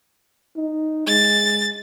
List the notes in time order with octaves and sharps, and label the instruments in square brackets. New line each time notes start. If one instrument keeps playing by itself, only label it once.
[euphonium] D#4
[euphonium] G#3 [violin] A6